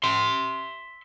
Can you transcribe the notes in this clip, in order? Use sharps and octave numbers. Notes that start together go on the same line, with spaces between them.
E5 C6